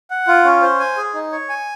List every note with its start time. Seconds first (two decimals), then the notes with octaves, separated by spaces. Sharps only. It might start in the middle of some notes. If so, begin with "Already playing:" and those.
0.10 F#5
0.27 F4
0.45 C#4
0.62 C5
0.80 G#5
0.97 G#4
1.14 D#4
1.32 C#5
1.49 G#5